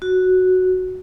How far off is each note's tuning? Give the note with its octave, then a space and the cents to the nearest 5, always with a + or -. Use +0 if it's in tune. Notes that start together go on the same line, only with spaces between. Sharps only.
F#4 +0